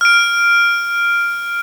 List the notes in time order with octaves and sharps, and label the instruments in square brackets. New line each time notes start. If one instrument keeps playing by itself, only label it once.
[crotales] F6 D7